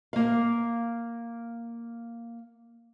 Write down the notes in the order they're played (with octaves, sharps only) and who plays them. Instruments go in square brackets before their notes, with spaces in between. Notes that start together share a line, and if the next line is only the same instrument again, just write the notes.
[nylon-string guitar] A#3 F5